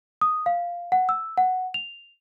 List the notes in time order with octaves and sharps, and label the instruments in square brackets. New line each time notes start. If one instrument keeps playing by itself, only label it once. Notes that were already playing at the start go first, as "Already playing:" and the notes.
[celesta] D#6
F5
F#5
E6
F#5
F7